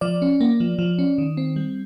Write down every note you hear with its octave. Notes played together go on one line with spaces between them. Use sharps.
F3 D5
C#4
A#3
F3
F3
C#4
D#3
C4
G3